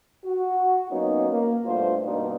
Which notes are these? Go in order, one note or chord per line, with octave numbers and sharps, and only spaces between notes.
F#4
F#3 A#3 B3 C#4 D#4
A#3
G2 B2 A3 F4 C5
G2 B2 A#3 D4 D#4